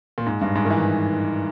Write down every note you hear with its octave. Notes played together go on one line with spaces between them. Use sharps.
A#2
G#2
G2
G#2
D#3
E3